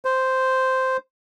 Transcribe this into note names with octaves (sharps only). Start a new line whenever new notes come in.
C5